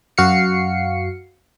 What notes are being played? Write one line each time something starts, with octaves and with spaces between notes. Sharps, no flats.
F#2 F#4 F5 C7 C#7